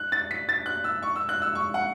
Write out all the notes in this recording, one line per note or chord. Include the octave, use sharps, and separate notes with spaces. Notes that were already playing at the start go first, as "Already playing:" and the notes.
Already playing: F#6
A6
B6
A6
F#6
E6
C#6
E6
F#6
E6
C#6
F#5